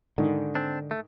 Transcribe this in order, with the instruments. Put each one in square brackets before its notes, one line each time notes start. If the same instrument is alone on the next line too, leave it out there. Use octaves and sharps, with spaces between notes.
[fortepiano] G#2 D#3 [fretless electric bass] D3
[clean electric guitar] C4 D4
A3